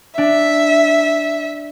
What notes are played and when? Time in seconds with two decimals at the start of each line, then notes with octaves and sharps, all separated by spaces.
0.18 D4 E5